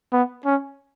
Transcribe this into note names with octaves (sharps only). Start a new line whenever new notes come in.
B3
C#4